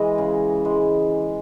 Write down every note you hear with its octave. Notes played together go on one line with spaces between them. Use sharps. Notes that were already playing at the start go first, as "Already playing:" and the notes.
Already playing: E3 G#3 D#5
C#3
E3 G#3